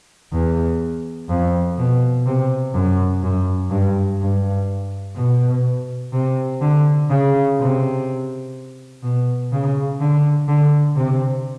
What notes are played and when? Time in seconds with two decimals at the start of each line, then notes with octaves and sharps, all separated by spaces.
0.32 E2
1.29 F2
1.78 B2
2.26 C3
2.74 F#2
3.23 F#2
3.71 G2
4.20 G2
5.16 B2
6.13 C3
6.61 D3
7.10 C#3
7.59 C3
9.03 B2
9.52 C#3
10.00 D3
10.48 D3
10.96 C3